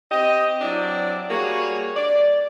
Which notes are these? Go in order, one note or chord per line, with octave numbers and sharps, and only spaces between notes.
C4 G4 D#5
F#3 C4 D4 E4 D5
G3 A#3 F#4 G#4 C#5
D5